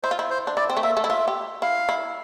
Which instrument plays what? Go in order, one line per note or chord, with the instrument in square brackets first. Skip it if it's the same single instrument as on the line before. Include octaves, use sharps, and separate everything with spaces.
[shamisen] E4 [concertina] C5
[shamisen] F4
E4
[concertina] C5
[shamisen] D4
[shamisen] E4 [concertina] D5
[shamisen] C4
A3
[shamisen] A#3 [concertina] E5
[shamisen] A3
E4
[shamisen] F4 [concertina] E5
[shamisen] G4
[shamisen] E4 [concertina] F5
[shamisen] E4